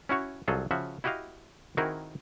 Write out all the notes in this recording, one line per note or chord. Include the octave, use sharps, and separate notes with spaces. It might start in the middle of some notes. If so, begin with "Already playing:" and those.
C#4 E4 F#4 C#5
C2 F#3 F4 G#4 A4
C#3 F3 F#4 E5
E4 F#4 G4 D#5 F5
D#3 C4 E4 F#4 G#4 A#4